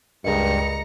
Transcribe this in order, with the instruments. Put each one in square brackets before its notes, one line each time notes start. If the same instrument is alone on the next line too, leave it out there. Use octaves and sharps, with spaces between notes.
[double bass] C#2 [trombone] G2 [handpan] G#4 A#4 D#5 [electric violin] A#5 C#7